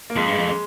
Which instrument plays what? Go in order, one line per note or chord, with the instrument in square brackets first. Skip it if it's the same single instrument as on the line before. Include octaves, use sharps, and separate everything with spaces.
[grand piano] A#3
[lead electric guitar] F2 [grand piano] G#3
[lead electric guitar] G2 [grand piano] G#3
[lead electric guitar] F2
[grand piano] G#3